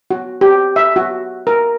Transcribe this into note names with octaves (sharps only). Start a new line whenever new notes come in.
F#4
G4
E5
F#4
A#4